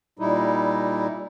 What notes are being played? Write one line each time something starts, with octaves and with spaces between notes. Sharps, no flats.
A#2 G3 D#4 E4